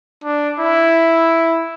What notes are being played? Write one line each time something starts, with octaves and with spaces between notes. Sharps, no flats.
D4
E4